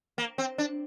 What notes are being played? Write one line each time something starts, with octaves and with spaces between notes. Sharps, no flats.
A#3
C4
D4